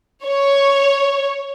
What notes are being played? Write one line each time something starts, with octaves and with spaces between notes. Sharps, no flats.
C#5